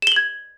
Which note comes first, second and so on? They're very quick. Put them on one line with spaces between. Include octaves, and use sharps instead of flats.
E7 G7 F#7 G#6